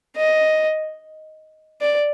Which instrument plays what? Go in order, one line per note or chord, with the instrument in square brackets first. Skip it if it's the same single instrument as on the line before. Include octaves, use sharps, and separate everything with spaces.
[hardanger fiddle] D#5
D5